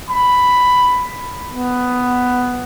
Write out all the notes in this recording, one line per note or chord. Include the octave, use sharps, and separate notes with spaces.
B5
B3